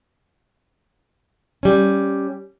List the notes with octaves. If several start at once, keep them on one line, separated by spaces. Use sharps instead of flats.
G3 C#4